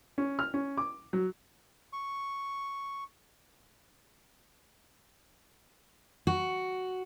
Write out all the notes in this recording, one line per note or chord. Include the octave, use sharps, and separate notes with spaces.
C#4
F6
C#4
D6
F#3
C#6
F#4